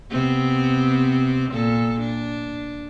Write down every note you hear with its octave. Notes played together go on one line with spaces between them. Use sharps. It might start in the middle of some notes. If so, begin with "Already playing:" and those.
C3 B3 C4
A#2 A4
D4